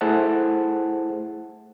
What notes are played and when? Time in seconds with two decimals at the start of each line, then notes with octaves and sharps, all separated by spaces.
0.01 A3 E4 G#4 C5 F#5 A5